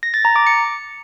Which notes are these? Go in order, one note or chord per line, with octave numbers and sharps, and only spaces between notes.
A#6
A6
A#5
D6
C#7